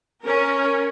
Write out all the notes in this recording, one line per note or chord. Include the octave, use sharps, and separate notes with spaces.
C#4 A#4